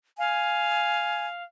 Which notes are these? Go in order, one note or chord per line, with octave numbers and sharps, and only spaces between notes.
F5 G#5